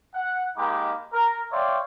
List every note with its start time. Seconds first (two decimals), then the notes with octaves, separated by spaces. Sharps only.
0.14 F#5
0.57 G#3 A#3 D#4 G4 B5 D6
1.13 A#4
1.51 C#5 D5 E5 F5 G5 C6